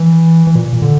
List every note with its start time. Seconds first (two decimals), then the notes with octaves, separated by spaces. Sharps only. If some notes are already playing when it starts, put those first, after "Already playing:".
Already playing: E3
0.47 E3
0.55 A#2
0.73 A#2
0.82 D3